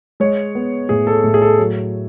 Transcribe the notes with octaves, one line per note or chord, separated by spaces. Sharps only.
G#3 C#5
B3
A2 G#4
A4
A2
G#4
A4
F#3